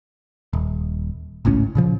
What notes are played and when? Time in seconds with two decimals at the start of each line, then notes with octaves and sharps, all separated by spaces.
0.53 D#1
1.45 G#1 C#2 A2 C#4
1.75 A#2 C#3 F3